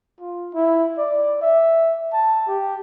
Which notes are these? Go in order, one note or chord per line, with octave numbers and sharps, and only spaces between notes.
F4
E4
D5
E5
A5
G4